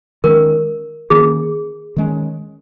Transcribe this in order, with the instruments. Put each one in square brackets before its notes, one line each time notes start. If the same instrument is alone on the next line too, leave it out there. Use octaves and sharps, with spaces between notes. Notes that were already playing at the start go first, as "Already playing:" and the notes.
[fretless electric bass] D#3 G#3 C#4 [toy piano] A#4
[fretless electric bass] D#3 A#3 C#4 [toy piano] G#4
[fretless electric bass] D#3 G#3 C#4